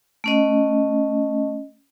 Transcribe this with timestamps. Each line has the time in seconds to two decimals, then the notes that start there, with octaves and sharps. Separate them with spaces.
0.24 A3 C#4 D#5